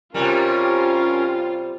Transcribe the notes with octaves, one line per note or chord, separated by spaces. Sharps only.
C3 G3 C#4 F4 A#4